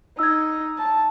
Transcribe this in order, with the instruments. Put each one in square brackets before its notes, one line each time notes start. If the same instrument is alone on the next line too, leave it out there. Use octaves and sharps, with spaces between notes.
[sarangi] D#4 [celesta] E6 G#6
[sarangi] A5